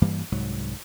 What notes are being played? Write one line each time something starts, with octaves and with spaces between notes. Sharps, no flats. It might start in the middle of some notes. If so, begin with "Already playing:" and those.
G2 E3 G3 A#3
C2 G#2 F#3